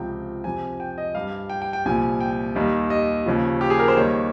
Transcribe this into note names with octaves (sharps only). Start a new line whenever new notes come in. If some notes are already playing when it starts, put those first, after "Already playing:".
Already playing: C#2 C3 F3 G5
F2 C3 F3 G#5
G5
D#5
G2 G3 F5
G5
G5
G5
C2 A#2 F3 G#5
G5
D#2 D#3 G3
D#5
D#2 C#3 F3
G4
G#4
A#4
C5
D#2 D#3 G3 C#5